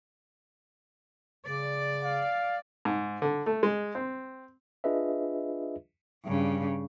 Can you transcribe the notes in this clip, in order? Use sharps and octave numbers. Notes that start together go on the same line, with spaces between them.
C#3 D5
F5
G#2
D3
A3
G#3
C4
D4 F4 G#4 B4 D#5 E5
G2 C#3